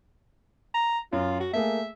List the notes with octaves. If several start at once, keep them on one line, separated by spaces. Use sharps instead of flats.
A#5
F#2 F4
F#4
A3 A#3 G#4 E5